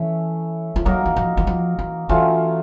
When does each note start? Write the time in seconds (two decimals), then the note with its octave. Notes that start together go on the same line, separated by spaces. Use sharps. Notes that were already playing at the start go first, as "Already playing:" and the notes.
Already playing: E3 A3 C#4 E4
0.76 F3
0.85 F#3 A#3 D#4 F#4 A#4
1.06 E3
1.16 F3
1.37 E3
1.47 F3
1.79 E3
2.09 E3 F#3 A3 C#4 F4